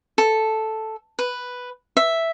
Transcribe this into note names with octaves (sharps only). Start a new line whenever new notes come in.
A4
B4
E5